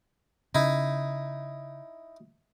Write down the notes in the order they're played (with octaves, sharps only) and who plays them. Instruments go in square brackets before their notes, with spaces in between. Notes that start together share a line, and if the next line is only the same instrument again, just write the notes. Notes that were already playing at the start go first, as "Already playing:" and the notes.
[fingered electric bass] C#3 [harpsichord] D#4 E4